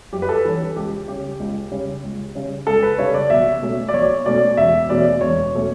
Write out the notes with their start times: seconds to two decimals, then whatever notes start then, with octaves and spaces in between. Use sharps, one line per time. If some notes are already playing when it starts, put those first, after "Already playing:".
0.13 F#2 G4
0.22 B4
0.29 A4
0.45 E3 G3 C#4
0.76 C#2 G4
1.08 C#3 G3 C#4 G4
1.40 C#2
1.71 C#3 G3 C#4
2.04 C#2
2.35 C#3 G3 C#4
2.67 C#2 A4
2.83 B4
2.98 C#3 G3 C#4 C#5
3.14 D5
3.30 B1 E5
3.62 B2 A3 C#4
3.88 D5
3.94 B1 C#5
4.26 B2 A3 C#4 D5
4.57 E1 E5
4.89 E2 B2 A3 C#4 D5
5.21 E1 C#5
5.54 B2 A3 C#4